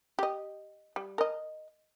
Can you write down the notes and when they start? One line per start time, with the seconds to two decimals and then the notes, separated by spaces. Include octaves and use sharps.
0.19 G4 D#5
0.96 G3
1.18 A#4 D#5